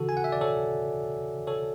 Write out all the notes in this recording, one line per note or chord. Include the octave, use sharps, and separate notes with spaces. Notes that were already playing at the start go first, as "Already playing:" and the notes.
Already playing: C#3 E3 F#4 A4
G#5
F#5
E5
D5
A4 C#5
A4 C#5